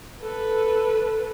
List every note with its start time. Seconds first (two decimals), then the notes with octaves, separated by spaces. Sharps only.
0.21 A4 B4